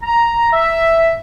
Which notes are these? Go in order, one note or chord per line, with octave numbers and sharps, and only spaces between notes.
A#5
E5